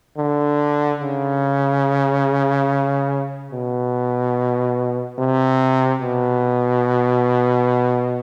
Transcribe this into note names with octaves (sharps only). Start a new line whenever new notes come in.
D3
C#3
B2
C3
B2